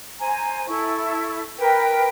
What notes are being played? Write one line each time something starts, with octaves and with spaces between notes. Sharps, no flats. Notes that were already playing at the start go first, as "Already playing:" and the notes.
C5 G#5 A#5
E4 A4 C#6
A#4 B4 G5